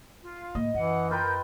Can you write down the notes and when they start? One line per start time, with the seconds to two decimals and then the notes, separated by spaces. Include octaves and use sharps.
0.22 F4
0.55 A2 A#3 D#5
0.74 F#2 E3 F#5
1.11 F4 A#4 B4 G5 G6